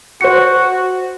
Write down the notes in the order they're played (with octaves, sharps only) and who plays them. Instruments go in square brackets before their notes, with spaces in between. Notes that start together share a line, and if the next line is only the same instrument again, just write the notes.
[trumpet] F#4 [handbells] C5 C#7